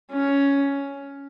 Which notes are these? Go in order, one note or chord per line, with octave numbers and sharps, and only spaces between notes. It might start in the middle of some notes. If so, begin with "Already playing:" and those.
C#4